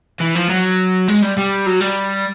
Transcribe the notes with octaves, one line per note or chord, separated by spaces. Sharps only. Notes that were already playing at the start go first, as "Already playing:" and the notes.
E3
F3
F#3
G#3
G3
G3
F#3
G3